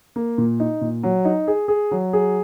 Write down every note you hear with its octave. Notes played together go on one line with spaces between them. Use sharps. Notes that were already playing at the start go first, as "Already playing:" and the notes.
A#3
A#2
D#4
A#2
F#3
D#4
G#4
G#4
F#3
G#4